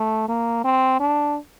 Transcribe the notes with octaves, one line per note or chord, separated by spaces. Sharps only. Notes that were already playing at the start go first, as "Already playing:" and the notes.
Already playing: A3
A#3
C4
D4